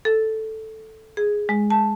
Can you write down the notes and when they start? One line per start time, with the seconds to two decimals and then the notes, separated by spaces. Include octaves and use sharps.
0.05 A4
1.17 G#4
1.49 G#3
1.70 A5